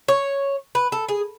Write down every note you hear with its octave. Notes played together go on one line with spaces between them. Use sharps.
C#5
B4
A4
G#4